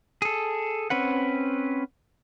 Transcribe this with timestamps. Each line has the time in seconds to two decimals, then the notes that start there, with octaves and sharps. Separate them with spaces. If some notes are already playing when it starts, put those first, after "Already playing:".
0.22 G#4 A4
0.90 C4 C#4 B4 F#5